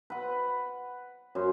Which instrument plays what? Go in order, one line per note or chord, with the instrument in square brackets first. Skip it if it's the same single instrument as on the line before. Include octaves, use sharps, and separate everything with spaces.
[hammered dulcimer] B4 F#5
F#2 C5